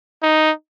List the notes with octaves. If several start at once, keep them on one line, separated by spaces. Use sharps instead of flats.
D#4